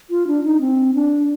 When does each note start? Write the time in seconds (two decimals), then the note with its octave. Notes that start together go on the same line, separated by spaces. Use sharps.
0.10 F4
0.27 D4
0.44 D#4
0.61 C4
0.94 D4